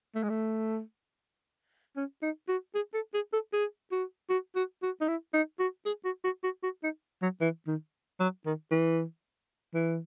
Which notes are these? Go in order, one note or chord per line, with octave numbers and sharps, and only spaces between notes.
A3
G#3
A3
C#4
D#4
F#4
G#4
A4
G#4
A4
G#4
F#4
F#4
F#4
F#4
D#4
E4
D#4
F#4
G#4
F#4
F#4
F#4
F#4
D#4
F#3
E3
D#3
F#3
D#3
E3
E3